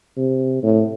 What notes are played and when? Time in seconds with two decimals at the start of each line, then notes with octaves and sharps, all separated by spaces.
0.17 C3
0.63 A2